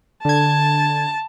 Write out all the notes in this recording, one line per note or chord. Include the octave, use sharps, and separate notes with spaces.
D3 A5 G#6